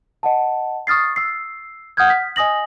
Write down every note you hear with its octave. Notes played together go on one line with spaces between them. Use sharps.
D#5 F#5 A5
C#6 D#6 F6 A6 C7
E6 C7
F#5 D#6 F6 G6 G#6
F6 B6
D#5 G#5 D#6 A#6 F#7